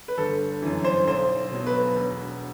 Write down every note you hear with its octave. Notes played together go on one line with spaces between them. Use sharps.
B4
G1 A4
F#2 E3
C5
B1 C5
B2 F#3
B4
E1